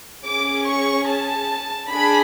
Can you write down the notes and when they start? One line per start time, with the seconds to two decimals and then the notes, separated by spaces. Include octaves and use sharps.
0.24 C#4 G#4 D6
0.66 C#6
1.08 A5
1.90 D4 G#4 B5